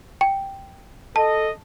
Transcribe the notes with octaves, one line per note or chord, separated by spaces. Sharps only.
G5
A4 D#5 A5